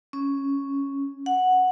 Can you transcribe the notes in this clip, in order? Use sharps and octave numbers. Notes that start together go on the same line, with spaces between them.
C#4
F#5